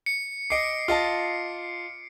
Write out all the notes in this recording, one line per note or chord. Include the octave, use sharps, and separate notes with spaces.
C#7
D#5 D6 C7 D7
F4 D#5 A5